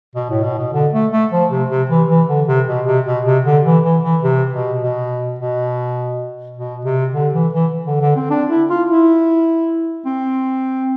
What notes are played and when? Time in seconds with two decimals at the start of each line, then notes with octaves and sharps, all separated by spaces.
0.15 B2
0.30 A2
0.43 B2
0.58 B2
0.73 D3
0.93 A3
1.12 A3
1.32 F3
1.50 C3
1.70 C3
1.90 E3
2.09 E3
2.28 D3
2.48 C3
2.68 B2
2.86 C3
3.06 B2
3.25 C3
3.45 D3
3.65 E3
3.84 E3
4.03 E3
4.23 C3
4.52 B2
4.82 B2
5.39 B2
6.56 B2
6.85 C3
7.14 D3
7.33 E3
7.53 E3
7.87 D3
8.01 D3
8.16 C4
8.31 D4
8.50 E4
8.70 F4
8.89 E4
10.05 C4